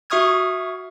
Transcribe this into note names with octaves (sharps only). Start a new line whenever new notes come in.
F#4 E5 C#6 D#6 F6 G#6